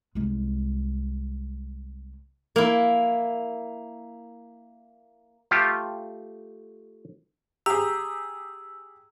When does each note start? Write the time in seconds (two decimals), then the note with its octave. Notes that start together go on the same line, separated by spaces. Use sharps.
0.15 C2 G#3
2.56 A#3 E4
5.51 A3 F4 G4 A4
7.66 G4 G#4 A#5 E6